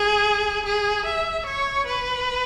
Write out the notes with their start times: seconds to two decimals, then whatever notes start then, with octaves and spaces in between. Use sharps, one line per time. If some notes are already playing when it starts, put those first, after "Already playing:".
Already playing: G#4
0.66 G#4
1.05 E5
1.46 C#5
1.86 B4